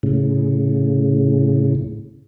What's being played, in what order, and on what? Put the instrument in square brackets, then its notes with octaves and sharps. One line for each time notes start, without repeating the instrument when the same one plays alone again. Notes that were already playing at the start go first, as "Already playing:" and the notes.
[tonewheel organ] A2 C#3